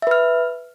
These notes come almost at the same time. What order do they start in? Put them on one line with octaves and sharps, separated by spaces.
E5 B4 F6